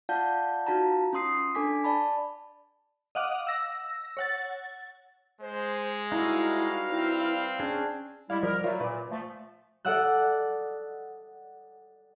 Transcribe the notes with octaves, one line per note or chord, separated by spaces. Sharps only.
F4 D5 F5 F#5 A5 G6
D#4 F4 F#4 F5 A5 A#5
C#4 F4 C6 D#6 C7
D4 A4 G#5 D6 B6
D5 A5 B5
D#5 F5 F#5 D6
E6 A#6
C#5 F#5 A6
G#3 C5
G3 D#4 E4 F#4 B4 F5
C4 E4
C#4 D4 G#4
G3 G#3 E4 F5
F3 G3 A#4
F#3 G3 A3 F4
A#2 B4 D5
F3 A3
A4 D5 D#5 F#5 E6 F#6